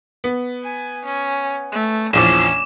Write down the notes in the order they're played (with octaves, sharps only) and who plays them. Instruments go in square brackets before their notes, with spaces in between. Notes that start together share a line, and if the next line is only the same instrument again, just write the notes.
[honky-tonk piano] B3
[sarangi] G#5
C#4
A3
[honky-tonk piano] A#1 E2 F3 [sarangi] C#4 [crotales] D6 E7